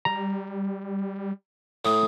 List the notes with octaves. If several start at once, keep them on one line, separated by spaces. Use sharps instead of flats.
G3 A#5
A2 D#6